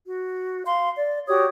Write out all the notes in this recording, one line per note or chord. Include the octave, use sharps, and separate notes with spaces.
F#4
F5 C6
D5
F#4 G4 C#5 D#6